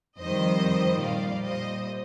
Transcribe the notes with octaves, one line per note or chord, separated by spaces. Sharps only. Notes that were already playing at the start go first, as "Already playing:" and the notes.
F2 D#3 G3 C5 D#5
A#2 G3 D5 F5
C5 D#5